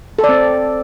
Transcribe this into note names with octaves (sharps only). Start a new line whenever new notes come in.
A4
D5
C4